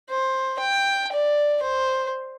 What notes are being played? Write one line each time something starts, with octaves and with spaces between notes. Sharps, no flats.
C5
G5
D5
C5